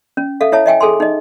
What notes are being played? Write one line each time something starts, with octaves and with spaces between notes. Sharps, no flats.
C#4
A4 E5 F5
E4 C#5 E5 A5
D#5 E5 G5 G#5
G#4 A4 G#5 C6
D#4 D#5